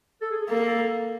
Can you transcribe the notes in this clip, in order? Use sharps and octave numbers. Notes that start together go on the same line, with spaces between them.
A4
G#4
G#4
A#3 A4
A4